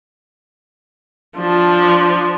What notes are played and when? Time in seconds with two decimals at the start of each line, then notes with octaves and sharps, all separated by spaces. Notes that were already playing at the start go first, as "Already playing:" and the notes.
1.38 F3 D4